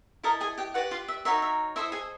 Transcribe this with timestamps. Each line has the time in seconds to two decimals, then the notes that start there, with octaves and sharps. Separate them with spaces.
0.23 E4 A4 A#4 D#5 A#5
0.40 G#4 G#5
0.58 G4 G5
0.74 F#4 G4 B4 D5 F#5
0.91 F4 F5
1.08 E5
1.25 D#4 F#4 A#4 C#5 E5
1.42 E5
1.76 E4 A4 C5 D#5 E5
1.92 G#4 G#5